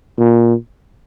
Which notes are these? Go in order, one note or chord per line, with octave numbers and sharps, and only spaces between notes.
A#2